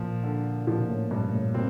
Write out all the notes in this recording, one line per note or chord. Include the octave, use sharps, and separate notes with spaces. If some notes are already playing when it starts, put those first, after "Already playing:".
Already playing: A#2 F3
D3
A#2 F3
A#2
A2
G2 A#2
A2
A#2 C4